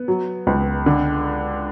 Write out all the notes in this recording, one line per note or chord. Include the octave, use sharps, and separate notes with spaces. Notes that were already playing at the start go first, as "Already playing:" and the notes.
Already playing: B3
F#3
C#2
D3